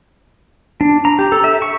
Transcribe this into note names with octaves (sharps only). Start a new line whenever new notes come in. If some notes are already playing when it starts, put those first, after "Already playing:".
D4
A#5
G4
A4
E5
C#6